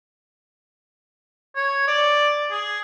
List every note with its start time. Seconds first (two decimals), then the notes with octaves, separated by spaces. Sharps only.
1.56 C#5
1.88 D5
2.51 G#4